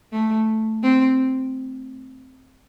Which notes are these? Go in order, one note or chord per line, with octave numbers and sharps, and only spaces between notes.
A3
C4